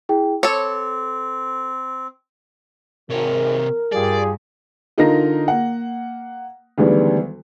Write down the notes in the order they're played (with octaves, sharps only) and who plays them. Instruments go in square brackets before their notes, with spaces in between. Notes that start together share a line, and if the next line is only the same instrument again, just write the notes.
[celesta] E4 G#4 G5
[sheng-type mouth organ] C4 [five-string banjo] A4 C#5 [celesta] D6
[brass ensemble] G#1 [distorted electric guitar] C3 C#5 [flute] A#4
[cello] G2 [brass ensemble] F4 G4 G#4 [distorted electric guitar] D5
[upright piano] D3 D#4 F4 A#4 A#5 A#6
A#3 F#5
D2 D#3 E3 G3 G#3 B3